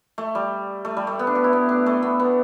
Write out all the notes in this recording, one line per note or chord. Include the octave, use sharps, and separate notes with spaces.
A3
G3
A3
G3
A3
B3
D4
G4
E4
B3
D4
A3
B3
B3